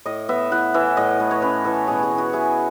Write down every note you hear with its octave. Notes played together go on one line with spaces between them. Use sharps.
A2 D#5
B3 E5
E4 F#5
E3 E5
A2 D#5
A3 B4
C#5
C#4 B4
E3 A4
B2 G#4
G#4
C#4
F#4
E4 G#4